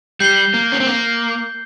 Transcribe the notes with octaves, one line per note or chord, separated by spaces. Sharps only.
G3 G6 C7 G7
A#3
C#4
C4
A#3